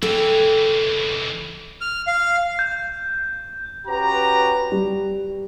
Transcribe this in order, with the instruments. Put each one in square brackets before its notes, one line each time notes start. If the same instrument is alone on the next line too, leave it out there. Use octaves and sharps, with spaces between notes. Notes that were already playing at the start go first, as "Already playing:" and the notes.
[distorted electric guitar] C#2 E3 [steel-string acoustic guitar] A4 G5
[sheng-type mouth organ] F6
F5
[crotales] G6
[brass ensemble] C#4 F#4 G4 B4 A#5
[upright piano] G3